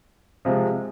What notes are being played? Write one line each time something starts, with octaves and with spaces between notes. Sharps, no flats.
C3 F3 G#3